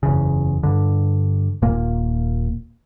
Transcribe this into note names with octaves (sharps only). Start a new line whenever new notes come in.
F#1 E2 C#3
G2 D3
D#1 A#2 A#3